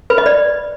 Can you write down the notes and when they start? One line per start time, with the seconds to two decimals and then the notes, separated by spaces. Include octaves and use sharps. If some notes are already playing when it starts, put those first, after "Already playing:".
0.10 B4
0.18 D#5
0.26 D5